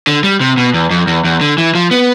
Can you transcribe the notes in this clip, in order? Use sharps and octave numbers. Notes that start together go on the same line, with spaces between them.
D3
G3
C3
B2
E2
F2
E2
E2
D3
E3
F3
B3